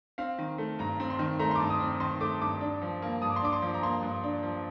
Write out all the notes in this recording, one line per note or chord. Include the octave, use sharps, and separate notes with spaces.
C4 F5
D#3
A3
G2 A#5
C4
C6
D#3
A3 A#5
C6
D6
G2
D#6
C4
D#3 C6
A3 D6
G2 D6
D4
F3
A#3
G2 D#6
D6
C6
D4 D6
C6
F3
A#5
A#3 C6
G2
D4
F3